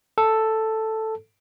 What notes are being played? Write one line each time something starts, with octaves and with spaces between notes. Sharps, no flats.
A4